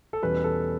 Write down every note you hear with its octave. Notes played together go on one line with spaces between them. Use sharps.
A4
E2 B2 G3 C#4 B4
A4